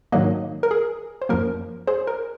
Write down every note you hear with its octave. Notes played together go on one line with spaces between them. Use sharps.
G#2 D#3 F#3 A#3 D#5 F#5
A#4
G#4
C5
F#2 F3 A#3 A#4
G#4 C5
A#4